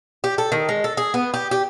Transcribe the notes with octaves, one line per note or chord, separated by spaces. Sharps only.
G4
A4
D#3
G#3
A4
G#4
B3
G4
G4